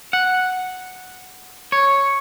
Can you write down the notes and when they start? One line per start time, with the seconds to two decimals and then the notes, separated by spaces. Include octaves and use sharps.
0.13 F#5
1.72 C#5